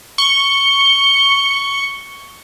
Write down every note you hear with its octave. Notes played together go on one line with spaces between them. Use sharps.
C#6 G7